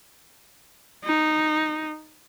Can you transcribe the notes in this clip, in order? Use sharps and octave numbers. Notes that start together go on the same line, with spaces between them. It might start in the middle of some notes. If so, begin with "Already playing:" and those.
D#4